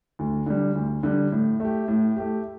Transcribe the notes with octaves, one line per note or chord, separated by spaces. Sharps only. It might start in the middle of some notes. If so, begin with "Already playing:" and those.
D2
D3 G3
D2
D3 G3
A2
A3 G4
A2
A3 G4